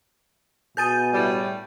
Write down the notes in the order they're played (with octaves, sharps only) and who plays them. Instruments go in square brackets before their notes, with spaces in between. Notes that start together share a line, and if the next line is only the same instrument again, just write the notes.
[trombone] B2 [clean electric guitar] G#4 [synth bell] G6 A6 D#7
[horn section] A2 G3